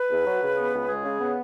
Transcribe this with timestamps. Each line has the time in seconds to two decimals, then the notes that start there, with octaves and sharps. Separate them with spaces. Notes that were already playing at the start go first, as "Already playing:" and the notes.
Already playing: B4
0.09 E2
0.25 F#3
0.41 C#3
0.57 B3
0.72 C#2
0.88 G#3 G#4
1.03 C#3
1.20 B3